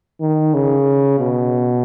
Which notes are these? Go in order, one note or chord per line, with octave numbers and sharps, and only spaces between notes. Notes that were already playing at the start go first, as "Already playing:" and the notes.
D#3
C#3
B2